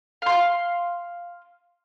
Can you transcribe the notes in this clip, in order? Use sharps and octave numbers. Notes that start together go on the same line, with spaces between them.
F5 C6